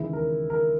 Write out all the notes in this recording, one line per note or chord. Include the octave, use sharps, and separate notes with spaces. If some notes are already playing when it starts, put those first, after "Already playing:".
Already playing: D#2 C#3 E3 G#3 E4
A#4
A#4